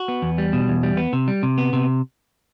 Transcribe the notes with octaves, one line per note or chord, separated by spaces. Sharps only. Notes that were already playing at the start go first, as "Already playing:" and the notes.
Already playing: F#4
B3
E2
G3
B2
E2
G3
B3
C3
G3
C3
B3
C3